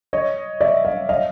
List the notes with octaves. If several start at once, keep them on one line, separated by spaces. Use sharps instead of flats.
C#5 D#5
D5 E5
D#5 F5
D#5 F5